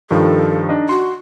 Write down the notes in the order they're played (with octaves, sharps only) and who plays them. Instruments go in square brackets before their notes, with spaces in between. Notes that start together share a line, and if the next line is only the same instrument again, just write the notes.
[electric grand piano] G2 D#3 F3 [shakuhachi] A4
[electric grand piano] D4 D#4 D#5
[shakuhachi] F#4 [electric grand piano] C6